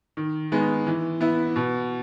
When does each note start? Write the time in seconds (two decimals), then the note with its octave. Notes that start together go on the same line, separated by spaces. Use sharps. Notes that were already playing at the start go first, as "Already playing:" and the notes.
0.17 D#3
0.52 G#3 B3 D#4
0.87 E3
1.21 B3 E4
1.56 B2